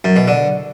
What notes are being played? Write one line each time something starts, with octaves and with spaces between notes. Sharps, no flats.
F#2
B2
D3